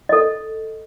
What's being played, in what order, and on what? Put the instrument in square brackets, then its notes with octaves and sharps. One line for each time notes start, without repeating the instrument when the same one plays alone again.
[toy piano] A4 D#5